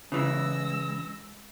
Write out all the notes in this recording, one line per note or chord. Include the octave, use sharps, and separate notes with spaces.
C#3 E3 G#3 E6 A#6